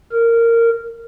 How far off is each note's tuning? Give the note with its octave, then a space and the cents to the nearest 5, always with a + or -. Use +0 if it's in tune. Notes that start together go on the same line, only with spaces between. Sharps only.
A#4 -15